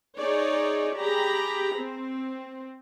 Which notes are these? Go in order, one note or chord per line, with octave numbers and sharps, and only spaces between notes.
D#4 G#4 C#5 D5
G4 G#4 A#5 B5
C4